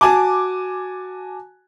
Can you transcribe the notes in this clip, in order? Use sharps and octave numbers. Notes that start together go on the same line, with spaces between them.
F#4 G#5 A5 D6